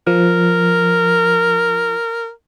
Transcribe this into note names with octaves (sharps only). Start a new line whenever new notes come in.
F3 A#4